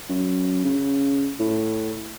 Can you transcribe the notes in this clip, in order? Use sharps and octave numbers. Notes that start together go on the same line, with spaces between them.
F#2
C#3
A2